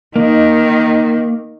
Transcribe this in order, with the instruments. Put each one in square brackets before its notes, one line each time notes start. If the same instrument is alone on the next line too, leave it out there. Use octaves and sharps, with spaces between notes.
[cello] D#3 [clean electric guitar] A#3 [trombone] D#4